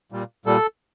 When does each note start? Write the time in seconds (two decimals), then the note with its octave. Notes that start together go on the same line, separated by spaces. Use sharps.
0.12 A#2 G3
0.46 A#2 G3 A4